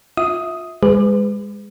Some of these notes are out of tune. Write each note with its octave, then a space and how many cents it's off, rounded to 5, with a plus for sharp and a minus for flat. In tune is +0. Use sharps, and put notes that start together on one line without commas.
F4 +20 E5 -20 D#6 +5
G#3 -25 G#4 -5 B4 +30